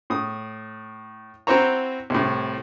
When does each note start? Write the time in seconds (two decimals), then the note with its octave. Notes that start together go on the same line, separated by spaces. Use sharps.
0.10 A2 D#6
1.47 C4 E4 F#4 C5 C#5 A#5
2.10 C2 A2